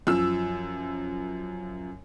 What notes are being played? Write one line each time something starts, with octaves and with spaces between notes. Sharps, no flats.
F#2 F3 E6